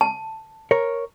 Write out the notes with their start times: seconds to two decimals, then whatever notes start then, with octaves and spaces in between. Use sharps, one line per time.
0.01 A5
0.71 A#4 C#5